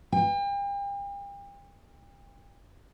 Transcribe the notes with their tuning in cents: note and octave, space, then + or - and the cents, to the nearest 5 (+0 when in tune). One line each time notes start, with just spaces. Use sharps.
G5 +40